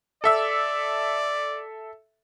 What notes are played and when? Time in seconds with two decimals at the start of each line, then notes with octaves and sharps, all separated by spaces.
0.24 A4 D5 E5 E6